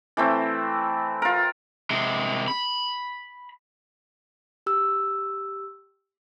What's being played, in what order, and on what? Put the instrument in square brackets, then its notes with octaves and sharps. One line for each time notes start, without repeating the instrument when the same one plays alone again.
[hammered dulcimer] E3 A3 C4
F4 A#4
[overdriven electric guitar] C3 G#3
B5
[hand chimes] G4 E6